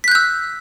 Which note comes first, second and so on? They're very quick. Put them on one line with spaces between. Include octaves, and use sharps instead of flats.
B6 F#6 G6 E6